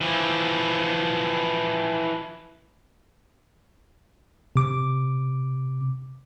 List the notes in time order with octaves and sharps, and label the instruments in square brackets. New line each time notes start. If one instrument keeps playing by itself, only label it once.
[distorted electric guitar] E3 F3
[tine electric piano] C3 D6